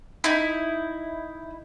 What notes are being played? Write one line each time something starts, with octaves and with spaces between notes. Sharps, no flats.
D#4 E4